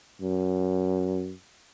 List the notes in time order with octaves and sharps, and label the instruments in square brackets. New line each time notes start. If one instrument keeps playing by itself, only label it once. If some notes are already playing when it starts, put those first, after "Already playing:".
[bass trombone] F#2